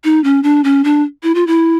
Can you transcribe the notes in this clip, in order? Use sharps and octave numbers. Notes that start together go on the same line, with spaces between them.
D#4
C#4
D4
C#4
D4
E4
F4
E4